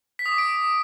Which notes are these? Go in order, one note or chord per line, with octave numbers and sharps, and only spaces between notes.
B6
D#6
D6
D7